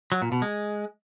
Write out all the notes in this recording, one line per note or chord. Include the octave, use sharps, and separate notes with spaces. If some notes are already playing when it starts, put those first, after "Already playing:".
F#3
A#2
B2
G#3